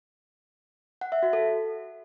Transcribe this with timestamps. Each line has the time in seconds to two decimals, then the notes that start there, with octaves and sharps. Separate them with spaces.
1.01 F#5
1.12 E5
1.23 F#4
1.33 A4